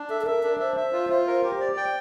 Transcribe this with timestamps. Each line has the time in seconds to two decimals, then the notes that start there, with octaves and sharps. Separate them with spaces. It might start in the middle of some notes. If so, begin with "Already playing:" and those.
Already playing: D4
0.09 A4 E5
0.21 A4
0.26 A#4 E5
0.43 D4 A#4
0.60 C5 E5
0.77 E5
0.93 F4
1.10 F4
1.27 A#4
1.44 G4
1.61 D5
1.77 G5